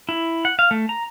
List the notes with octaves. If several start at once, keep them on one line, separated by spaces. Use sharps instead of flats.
E4
F#5
F5
A3
A#5